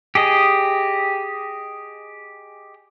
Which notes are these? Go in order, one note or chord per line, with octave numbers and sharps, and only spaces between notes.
G4 G#4 D#5